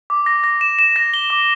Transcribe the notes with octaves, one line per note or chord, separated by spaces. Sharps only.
D6
A#6
A#6
E7
E7
A#6
G7
D6